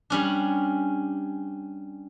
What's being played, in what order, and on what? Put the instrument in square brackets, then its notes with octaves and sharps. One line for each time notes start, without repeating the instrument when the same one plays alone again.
[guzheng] G3 C#4 D4